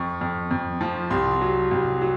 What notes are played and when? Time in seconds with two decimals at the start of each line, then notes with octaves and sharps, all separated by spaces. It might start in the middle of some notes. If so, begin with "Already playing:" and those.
Already playing: F2 C#6
0.21 F2
0.51 F2
0.81 F3
1.10 C2 C6
1.41 F#3
1.71 C2
2.01 F#3